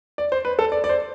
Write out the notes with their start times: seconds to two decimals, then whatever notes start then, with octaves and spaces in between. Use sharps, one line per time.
0.18 D5
0.32 C5
0.45 B4
0.59 A4
0.72 D5
0.84 D5
0.89 C5